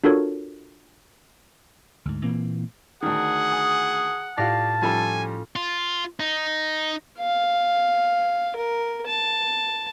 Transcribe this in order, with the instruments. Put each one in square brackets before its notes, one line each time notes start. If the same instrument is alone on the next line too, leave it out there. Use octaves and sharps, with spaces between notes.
[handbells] D4 F4 F#4 A4 A#4 C#5
[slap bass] D2 G#2
A#2 E3 A#3 C4
[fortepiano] D2 D#3 [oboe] G#4 [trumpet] F#5
[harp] G#5 D#6
[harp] A2 F5 A#6 [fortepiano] F4 G4 D5 [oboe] A5
[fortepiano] F2 G3 [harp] C#4 F4 A4 [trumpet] G#5
[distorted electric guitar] F4
D#4
[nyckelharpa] F5
A#4
A5